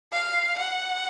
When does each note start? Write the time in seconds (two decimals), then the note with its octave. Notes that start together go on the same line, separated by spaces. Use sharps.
0.12 F5
0.59 F#5